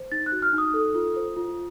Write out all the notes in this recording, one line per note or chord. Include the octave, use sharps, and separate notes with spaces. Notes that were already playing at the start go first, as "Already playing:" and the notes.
Already playing: C5
D#4 A6
F#6
F#4
F6
D#4 D#6
A4
F4
C5
F4